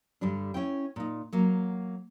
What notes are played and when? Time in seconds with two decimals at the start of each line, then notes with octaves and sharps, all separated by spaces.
0.21 G2 D3 G3 D4
0.54 C#4 E4 G5
0.96 A#2 D#4
1.33 F#3 A#3